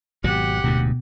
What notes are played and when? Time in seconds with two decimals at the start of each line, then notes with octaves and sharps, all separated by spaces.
0.24 G#1 B2 F#3 G4 F#5
0.64 D1 D2 G#2 B2